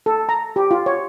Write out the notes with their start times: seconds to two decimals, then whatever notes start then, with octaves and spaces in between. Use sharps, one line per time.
0.06 A4
0.29 A#5
0.56 G4
0.71 F4
0.86 C#5